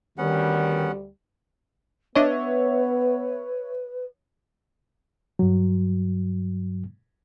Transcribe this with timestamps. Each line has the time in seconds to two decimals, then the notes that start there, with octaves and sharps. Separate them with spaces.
0.18 D2 D#3 G3 B3 C#4 F#5
2.15 B3 D4 B4 C#5 D#5 E5
5.39 G2 F#3